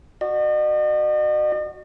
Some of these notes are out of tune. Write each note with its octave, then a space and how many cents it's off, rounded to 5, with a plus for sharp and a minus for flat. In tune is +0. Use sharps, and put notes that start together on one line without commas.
F#4 +0 D#5 -45